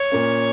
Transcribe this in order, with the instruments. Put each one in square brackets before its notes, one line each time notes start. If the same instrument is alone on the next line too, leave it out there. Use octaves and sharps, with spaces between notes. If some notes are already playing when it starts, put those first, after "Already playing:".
Already playing: [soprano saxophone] C#5
[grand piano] A#2 A#3 C#4